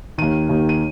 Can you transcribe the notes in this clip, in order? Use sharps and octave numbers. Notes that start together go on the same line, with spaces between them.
D#2 D#3 D#7
D#2 D#3
D#7